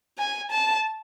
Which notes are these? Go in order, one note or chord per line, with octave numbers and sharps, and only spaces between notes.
G#5
A5